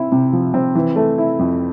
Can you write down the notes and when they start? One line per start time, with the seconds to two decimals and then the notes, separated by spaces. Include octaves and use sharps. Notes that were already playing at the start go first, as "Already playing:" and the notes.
Already playing: C4 E4
0.12 C3
0.33 F3
0.54 C4
0.75 E3
0.96 A3
1.18 E4
1.39 F2